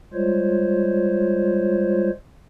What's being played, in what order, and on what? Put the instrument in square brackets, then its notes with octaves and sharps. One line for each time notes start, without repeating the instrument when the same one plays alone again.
[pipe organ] G3 G#3 F4 C5 C#5